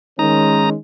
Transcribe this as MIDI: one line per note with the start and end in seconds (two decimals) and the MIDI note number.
0.19 0.74 51
0.19 0.76 56
0.19 0.74 61
0.19 0.70 63
0.19 0.70 82